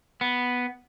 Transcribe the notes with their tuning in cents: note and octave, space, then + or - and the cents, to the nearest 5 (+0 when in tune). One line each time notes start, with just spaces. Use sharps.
B3 +0